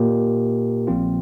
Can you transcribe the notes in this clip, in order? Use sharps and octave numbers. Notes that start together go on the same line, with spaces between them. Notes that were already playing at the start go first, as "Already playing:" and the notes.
Already playing: A#2 A#3 G4 A#4
A#1 A#2 F3 C4 F4